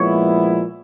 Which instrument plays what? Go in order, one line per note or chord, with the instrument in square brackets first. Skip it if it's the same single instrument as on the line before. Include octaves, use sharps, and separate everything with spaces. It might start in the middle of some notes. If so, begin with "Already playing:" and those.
Already playing: [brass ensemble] A#2 F3 G#3 B3 E4 [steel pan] C#5